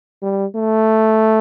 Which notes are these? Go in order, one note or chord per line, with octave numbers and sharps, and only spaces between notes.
G3
A3